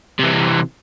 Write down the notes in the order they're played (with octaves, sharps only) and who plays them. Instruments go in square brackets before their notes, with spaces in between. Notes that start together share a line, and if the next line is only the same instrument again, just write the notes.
[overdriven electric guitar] C3 E3